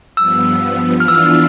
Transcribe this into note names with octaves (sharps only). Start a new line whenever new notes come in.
G2 F3 B3 E6
E3 B3 D4 F4 F6
E6
F6